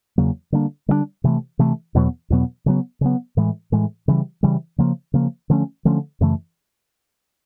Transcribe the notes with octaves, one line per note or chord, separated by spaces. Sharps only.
E2 C#3 F#3 A#3
D3 G3 A#3 D4
D3 G3 A#3 D4
C3 E3 A3
C3 E3 A3
E2 B2 F#3 B3
E2 B2 F#3 B3
C#3 F#3 B3
C#3 F#3 B3
A2 E3 G#3
A2 E3 G#3
C#3 E3 G3
C#3 E3 G3
C#3 F3 A#3
C#3 F3 A#3
D3 F3 A3 C#4
D3 F3 A3 C#4
F#2 C#3 E3 A3